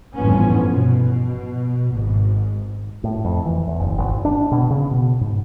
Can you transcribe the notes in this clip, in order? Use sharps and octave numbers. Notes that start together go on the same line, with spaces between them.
G1 A2 E3 F3 B3 C#4
B2
G#1 G#2
A2
F2
E3
E2
F#1
G#1
D4
B2
C#3
B2
G#2